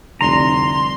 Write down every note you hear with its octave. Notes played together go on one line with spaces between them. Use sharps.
F1 C2 D3 A#5 C6